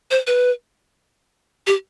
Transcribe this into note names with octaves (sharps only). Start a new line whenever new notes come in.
C5
B4
G4